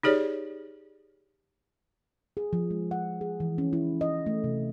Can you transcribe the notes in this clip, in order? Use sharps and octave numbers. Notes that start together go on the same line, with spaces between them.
D#4 G4 G#4 C#5 D5
G#4
F3
G#3
F#5
G#4
E3
C#4
E4
D#5
A3
C3